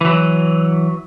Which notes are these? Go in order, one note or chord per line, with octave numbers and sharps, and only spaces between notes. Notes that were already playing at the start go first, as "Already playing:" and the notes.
E3 F#3